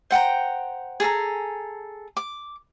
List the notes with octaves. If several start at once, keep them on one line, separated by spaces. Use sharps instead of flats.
C5 F#5 G5 A#5
G#4 A4 A#5
D6